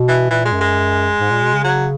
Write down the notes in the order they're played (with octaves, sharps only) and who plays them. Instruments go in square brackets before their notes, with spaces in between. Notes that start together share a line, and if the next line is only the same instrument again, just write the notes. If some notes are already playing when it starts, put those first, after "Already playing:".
Already playing: [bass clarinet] B2
[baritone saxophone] E3
[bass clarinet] A#2 [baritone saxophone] E3
[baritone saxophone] G#3
[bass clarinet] F#2
[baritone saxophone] G#3
[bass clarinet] G#2
A#2
B2
C#3
[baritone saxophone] F#3